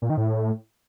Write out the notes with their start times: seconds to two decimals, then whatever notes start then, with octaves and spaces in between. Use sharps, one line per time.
0.02 A#2
0.10 D#3
0.17 A2